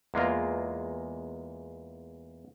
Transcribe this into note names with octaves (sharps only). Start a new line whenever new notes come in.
E2 G#3 A#3 F4